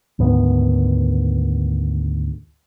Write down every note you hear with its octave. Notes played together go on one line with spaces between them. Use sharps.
D2 G#2 D#3 B3